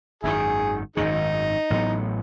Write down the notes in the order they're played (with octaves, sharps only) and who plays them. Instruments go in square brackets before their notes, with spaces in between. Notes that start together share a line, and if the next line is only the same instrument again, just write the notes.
[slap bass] G#1 F#2 D#3 [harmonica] E4 G#4
[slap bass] G#1 F#2 D#3 [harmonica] G#3 D#4
[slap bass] A1 A2 F#3 B3